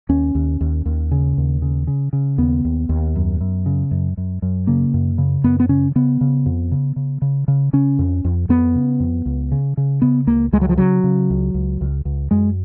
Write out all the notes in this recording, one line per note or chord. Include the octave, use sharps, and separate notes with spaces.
D#2 C#4
D#2
D#2
D#2
C#3
D#2
C#3
C#3
C#3
D#2 B3
D#2
D#2
F#2
F#2
C#3
F#2
F#2
F#2
C#3 A#3
F#2
C#3
F#2 B3
B3
C#3 C#4
C#3 B3
C#3
F2
C#3
C#3
C#3
C#3
C#3 C#4
F2
F2
F2 B3
C#3
F2
C#2
C#3
C#3
C#3 B3
C#2 A#3
C#2 G#3
F#3
F3
C#3 F#3
C#3
C#2
C#2
C#2
C#2
F#2 G#3